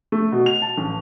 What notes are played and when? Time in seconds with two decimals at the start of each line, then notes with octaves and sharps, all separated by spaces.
0.12 A3
0.32 B2
0.46 F7
0.62 A5
0.78 A1